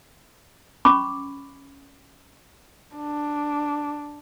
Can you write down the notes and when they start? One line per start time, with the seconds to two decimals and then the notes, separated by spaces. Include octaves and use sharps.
0.85 C#4 B5 C#6 D6
2.96 D4